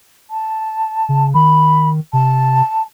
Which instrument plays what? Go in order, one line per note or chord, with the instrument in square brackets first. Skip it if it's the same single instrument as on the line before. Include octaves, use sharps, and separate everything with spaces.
[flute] A5
[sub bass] C#3
[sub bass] D#3 [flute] B5
[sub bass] C3 [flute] A5